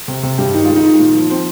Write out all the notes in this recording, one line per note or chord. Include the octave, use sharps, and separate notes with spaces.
C3
C3
G2 G4
D#3 D#4
G#3 F4
D#4
D#3
A#2
F3
F3 C4